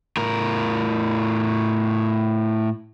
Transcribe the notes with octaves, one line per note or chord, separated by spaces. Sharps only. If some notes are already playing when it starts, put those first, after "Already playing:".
A2 A#4